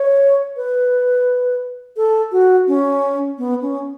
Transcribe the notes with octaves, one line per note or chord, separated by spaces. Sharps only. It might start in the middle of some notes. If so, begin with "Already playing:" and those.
Already playing: C#5
B4
A4
F#4
C#4
B3
C#4